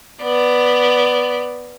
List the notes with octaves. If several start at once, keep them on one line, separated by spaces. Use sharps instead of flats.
B3 D5